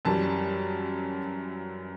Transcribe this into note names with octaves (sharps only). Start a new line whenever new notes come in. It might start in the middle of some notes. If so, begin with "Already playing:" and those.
F#2 E3 G3 A5